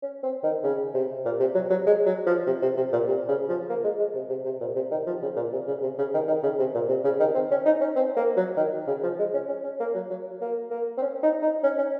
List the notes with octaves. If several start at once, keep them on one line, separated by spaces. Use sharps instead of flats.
C#4
C4
D#3
C#3
C3
A#2
C3
F#3
F#3
G#3
F#3
F3
C3
C3
C3
A#2
C3
C#3
F3
A#3
G#3
G#3
C3
C3
C3
A#2
C3
D#3
F3
C#3
A#2
C3
C#3
C3
C#3
D#3
D#3
C#3
C3
A#2
C3
C#3
D#3
C4
C#4
D#4
C#4
C4
A#3
F#3
D#3
C#3
F3
G#3
C#4
C#4
C#4
A#3
F#3
F#3
A#3
A#3
C4
C#4
D#4
D#4
C#4
C#4